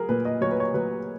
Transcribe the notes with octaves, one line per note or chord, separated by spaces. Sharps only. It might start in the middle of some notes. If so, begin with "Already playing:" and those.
Already playing: F#3 G#4 A#4
A#2 B4
D#5
F#3 C#5
B4
C#5
F#3 B4